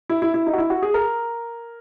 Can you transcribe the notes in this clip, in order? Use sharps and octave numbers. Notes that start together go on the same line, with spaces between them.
E4
E4
E4
D#4
F#4
E4
F#4
G#4
A#4